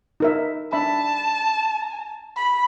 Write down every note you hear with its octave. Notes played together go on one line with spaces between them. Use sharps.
D#4 A#4 E5
D4 E5 A5 B5
B5